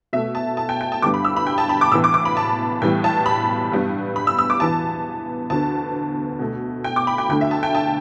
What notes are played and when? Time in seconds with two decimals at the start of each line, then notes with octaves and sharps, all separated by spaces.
0.13 B2 E5
0.16 A3
0.35 A5
0.57 A5
0.69 G5
0.81 G5
0.92 A5
1.02 G2 D3 G3 B3 D6
1.14 B5
1.25 E6
1.36 B5
1.47 G5
1.58 A5
1.69 B5
1.81 D6
1.91 A2 E3 B3 E6
2.04 D6
2.14 D6
2.25 B5
2.37 A5
2.82 A2 E3 G3 B3 G5
3.04 A5
3.26 B5
3.72 G2 G3 B3
4.16 B5
4.27 E6
4.38 E6
4.50 D6
4.60 E2 E3 B3 A5
5.50 D2 D3 B3 A5
6.39 B2 A3
6.84 G5
6.96 D6
7.07 B5
7.18 G5
7.29 D2 D3 A3 G5
7.41 E5
7.51 A5
7.63 G5
7.75 A5